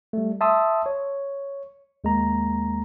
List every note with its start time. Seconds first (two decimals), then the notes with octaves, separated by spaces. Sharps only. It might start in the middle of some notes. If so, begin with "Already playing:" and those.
0.13 G3 A3
0.41 E5 A5 C6 D#6 E6
0.86 C#5
2.04 D#2 G#3 A#3 A#5